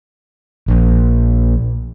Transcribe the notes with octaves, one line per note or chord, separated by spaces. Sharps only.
A#1